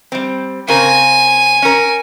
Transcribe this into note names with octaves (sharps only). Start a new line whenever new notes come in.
G3 C4
C#3 C4 A#4 G#5
C#4 A#4